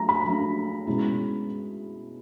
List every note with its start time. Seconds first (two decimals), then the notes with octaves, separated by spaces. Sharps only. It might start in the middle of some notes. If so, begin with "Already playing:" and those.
Already playing: F#3 A3 D4 A#5
0.09 B5
0.25 F#3 A3 D4
0.87 B2 G#3 C#4 E4